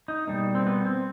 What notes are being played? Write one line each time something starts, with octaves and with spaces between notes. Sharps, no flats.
D#4
B2 G3 A#3 D#4
C4
B3
C4